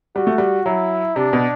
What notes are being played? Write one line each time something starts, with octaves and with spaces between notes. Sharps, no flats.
G3 F#4
A3
G3
F#3 E4
C3 D4
B2